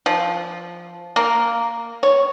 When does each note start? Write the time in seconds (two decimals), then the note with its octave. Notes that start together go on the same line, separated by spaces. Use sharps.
0.06 F3
1.16 A#3
2.03 C#5